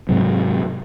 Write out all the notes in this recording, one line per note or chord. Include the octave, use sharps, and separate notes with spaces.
G#2 C3 F#3